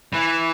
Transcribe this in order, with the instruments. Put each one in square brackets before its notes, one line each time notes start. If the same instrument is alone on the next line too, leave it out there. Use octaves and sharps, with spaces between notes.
[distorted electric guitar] E3